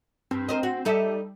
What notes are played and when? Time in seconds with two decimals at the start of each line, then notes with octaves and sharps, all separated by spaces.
0.31 G2 C4
0.49 A#4 C5 D#5
0.63 F#4
0.85 G3 D#4 A4 E5